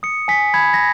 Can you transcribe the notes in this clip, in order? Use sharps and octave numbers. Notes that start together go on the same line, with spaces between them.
D#6 C#7
G#5 B6
B5 G#6
A#6